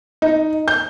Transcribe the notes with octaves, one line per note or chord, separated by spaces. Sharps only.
D#4
G6